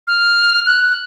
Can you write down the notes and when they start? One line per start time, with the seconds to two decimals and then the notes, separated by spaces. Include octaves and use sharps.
0.08 F6
0.66 F#6